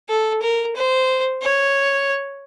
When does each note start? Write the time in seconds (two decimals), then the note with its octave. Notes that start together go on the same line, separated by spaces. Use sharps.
0.09 A4
0.42 A#4
0.75 C5
1.42 C#5